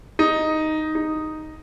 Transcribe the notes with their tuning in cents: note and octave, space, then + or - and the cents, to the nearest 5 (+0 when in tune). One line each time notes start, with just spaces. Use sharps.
D#4 +0
D#4 -5